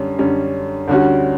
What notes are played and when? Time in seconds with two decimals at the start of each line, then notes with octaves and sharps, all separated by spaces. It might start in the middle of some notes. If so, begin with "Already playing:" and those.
Already playing: F#2 D3 G3 C#4
0.19 F#2 D3 G3 C#4
0.88 D2 D3 G3 C#4 F#4